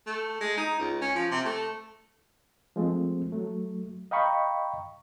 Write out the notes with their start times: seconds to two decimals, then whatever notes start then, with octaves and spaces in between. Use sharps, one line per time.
0.07 A3
0.41 G#3
0.57 D#4
0.80 C#2
1.01 C#4
1.15 F3
1.31 C3
1.45 A3
2.76 F3 G#3 A3 C4
3.32 F#3 A3
4.11 D#5 F5 G5 A#5 B5 C#6